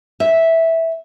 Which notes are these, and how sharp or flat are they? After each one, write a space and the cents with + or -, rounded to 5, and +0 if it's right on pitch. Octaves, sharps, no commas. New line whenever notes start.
E5 -10